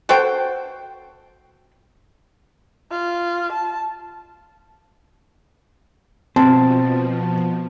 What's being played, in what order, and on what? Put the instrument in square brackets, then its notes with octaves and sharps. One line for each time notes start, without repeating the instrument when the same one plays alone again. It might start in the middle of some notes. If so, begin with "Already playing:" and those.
[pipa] F#4 A4 C5 G5
[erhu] F4
A5
[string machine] B2 F3 [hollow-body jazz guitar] C4 [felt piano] A5